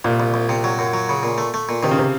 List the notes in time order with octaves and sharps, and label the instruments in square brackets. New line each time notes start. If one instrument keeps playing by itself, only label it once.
[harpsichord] C2 [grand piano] A#2
[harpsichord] C2
C2
C3
F#3
F#2
F#3
C#3
A#2
A3
A3
A#2
[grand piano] C3 [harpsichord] D#3
[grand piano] C#3
C3